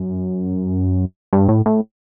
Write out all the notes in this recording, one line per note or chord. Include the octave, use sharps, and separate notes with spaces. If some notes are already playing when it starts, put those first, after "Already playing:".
Already playing: F#2
G2
A2
A2